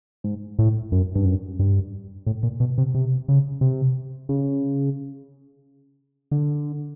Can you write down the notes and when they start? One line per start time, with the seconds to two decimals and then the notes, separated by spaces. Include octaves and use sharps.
0.24 G#2
0.59 A2
0.92 F#2
1.15 G2
1.25 F#2
1.59 G2
2.26 A2
2.43 A#2
2.60 B2
2.78 C3
2.95 C3
3.28 C#3
3.61 C3
4.29 C#3
6.31 D3